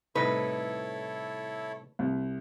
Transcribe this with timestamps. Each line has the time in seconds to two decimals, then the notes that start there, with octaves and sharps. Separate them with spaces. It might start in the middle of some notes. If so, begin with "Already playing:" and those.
0.15 C2 A2 D#4 E4 A4 B4 C#5
1.99 C2